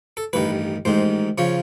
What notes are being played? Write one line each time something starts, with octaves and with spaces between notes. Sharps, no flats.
A4
A1 G2 D#3 B4
A1 G#2 D#3 C5
C#3 F3 C#5